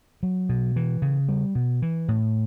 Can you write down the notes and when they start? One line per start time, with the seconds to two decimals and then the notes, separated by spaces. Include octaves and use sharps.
0.23 F#3
0.49 B2
0.76 E3
1.02 C#3
1.29 G3
1.55 B2
1.82 E3
2.08 A2